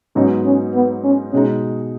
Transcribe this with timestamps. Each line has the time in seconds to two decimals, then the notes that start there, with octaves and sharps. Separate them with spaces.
0.15 G#2 F#3 B3 C#4 D#4
0.45 C#4
0.74 B3
1.04 C#4
1.33 B2 G#3 C#4 D#4